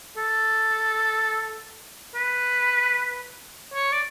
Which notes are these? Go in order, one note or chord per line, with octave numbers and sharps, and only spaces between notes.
A4
B4
C#5
D5